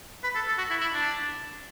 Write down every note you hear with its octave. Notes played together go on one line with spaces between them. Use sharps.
B4
A4
A4
F#4
E4
E4
D4